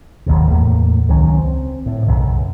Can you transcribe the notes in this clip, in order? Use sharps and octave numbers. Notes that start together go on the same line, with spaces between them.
F#1 D#2 A2 C3
E2 A2 A#3
C#2 D#3 F#3 C#4
C4
A2
B1 F#2 C#3